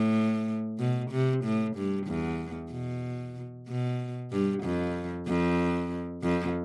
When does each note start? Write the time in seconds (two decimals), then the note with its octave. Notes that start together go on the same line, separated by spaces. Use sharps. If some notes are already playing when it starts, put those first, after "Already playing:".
Already playing: A2
0.80 B2
1.11 C3
1.44 A2
1.76 G2
2.07 E2
2.71 B2
3.68 B2
4.32 G2
4.63 F2
5.27 F2
6.23 F2